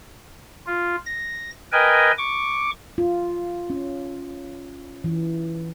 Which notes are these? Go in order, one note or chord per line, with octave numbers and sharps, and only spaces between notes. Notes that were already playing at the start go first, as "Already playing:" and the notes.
F4
A#6
A#4 B4 D#5 G5 G#5
C#6 D6
F4
C#4
E3